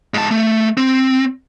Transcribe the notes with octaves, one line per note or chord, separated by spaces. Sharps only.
G#2 A5
A3
C4